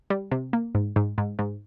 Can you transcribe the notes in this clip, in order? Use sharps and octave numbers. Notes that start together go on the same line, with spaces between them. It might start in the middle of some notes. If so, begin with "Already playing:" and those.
G3
C3
A#3
G#2
G#2
G#2
G#2